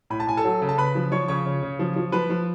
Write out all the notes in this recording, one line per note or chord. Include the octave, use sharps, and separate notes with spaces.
A2 B5
A5
A2 G#5
A4 A5
F#3
C#3
A5
C#3 B4 B5
F3
F3 C#5 C#6
C#3 C#5 C#6
C#3
C#3
F3
F3
F3 B4 B5
F3